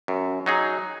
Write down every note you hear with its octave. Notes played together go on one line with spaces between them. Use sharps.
F#2
F#3 D#4 G#4